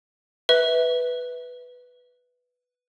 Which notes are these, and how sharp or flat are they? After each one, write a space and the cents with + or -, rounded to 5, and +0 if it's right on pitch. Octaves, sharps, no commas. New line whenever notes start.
B4 +0 E5 -20